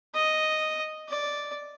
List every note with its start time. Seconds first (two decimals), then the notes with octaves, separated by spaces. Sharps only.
0.15 D#5
1.09 D5